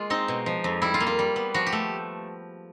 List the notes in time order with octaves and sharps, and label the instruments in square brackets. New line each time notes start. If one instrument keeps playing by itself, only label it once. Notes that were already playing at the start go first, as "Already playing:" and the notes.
Already playing: [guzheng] G#3 A#3 F4
C4 D#4
B2
F3
F2
G3 E4
F4
A#3
F4
G3
B3
F3 F#4
G4
A3